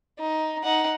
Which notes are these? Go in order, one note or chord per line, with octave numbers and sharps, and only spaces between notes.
D#4
D#4 F#5